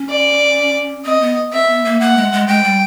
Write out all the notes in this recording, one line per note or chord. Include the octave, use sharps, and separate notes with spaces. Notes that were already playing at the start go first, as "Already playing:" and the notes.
Already playing: C#4
D5
C4 D#5
B3
C4 E5
B3
A#3
A#3 F#5
G#3
G#3
G#3 G5
G3